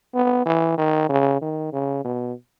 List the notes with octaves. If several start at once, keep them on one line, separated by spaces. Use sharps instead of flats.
B3
E3
D#3
C#3
D#3
C#3
B2